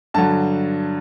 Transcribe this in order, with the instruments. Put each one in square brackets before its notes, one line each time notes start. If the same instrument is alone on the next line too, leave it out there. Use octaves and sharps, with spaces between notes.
[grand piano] G2 D3 F#3 A5